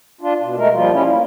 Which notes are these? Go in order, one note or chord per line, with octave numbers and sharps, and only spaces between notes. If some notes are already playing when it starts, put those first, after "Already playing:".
D4 F4
B2
B2 G#3 A3 A#4
F3 G3 A#3 F4
G3 C#4 E4
A#3